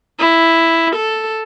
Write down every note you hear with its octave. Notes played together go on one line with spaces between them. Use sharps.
E4
A4